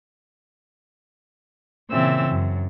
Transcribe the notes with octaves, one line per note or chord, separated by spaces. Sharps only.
A#2 C#3 E3 C4 E5 E6
F#2